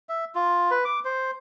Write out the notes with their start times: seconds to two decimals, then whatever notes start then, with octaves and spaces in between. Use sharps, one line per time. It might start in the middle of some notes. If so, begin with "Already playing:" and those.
0.09 E5
0.35 F4
0.71 B4
0.85 D6
1.05 C5